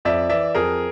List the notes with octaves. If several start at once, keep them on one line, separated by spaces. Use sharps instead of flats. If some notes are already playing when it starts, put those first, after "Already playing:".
F2 D5 E5
E3 D5 E5
F2 G#4 A#4